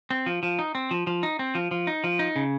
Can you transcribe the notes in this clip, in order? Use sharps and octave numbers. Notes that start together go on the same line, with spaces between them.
C4
F3
F3
D#4
C4
F3
F3
D#4
C4
F3
F3
D#4
F3
D#4
C#3